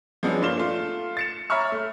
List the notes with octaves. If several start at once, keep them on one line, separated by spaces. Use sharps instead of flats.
F3 F#3 G#3 B3 C#4 D4
G2 A#3 F4 D5 E7 G7
A3 F4
A6 C#7 E7
C#5 E5 A#5 B5 C#6 F6
A3